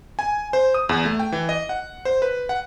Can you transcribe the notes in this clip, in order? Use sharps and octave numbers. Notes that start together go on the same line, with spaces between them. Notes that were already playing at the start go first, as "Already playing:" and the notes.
G#5
C5
D#6
E2
A3
G5
E3
D#5
F#5
C5
B4
F#5